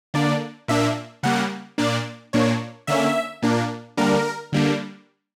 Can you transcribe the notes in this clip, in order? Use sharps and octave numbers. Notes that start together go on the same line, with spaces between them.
D3 A#3 D4 D5
A#2 A#3 D4 E5
C#3 G3 A#3 F#5
A#2 A#3 D4 D5
A#2 A#3 D4 C#5
D3 A#3 C#4 E5
A#2 A#3 D4
D3 G3 A#3 D4 A#4
D3 G3 A#3 D4